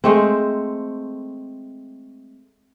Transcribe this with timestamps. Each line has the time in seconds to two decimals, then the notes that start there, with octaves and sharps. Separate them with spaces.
0.04 G#3 A3 C4